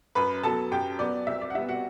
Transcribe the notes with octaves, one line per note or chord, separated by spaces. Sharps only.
F#2 B4 B5
F#3 B3 A4 A5
F#2 G4 G5
F#3 B3 D5
C2 E5
D5
F#5
C3 G3 B3 E5
F#4 F#5